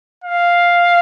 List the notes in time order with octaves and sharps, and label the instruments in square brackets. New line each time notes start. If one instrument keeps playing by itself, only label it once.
[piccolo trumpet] F5